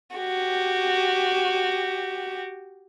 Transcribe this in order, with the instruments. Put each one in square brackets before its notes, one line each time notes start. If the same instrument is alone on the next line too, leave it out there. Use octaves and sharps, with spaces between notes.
[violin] F#4 G4